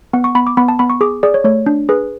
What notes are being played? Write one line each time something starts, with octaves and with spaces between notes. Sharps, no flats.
B3 F#5
C#6
B3 B5
D6
B3 B5
A5
B3 B5
C#6
G#4 D6
G#4 D5
C#5
A3 C#5
D4
G#4 B4